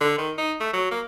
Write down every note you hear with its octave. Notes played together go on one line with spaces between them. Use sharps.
D3
D#3
D#4
A3
F#3
A#3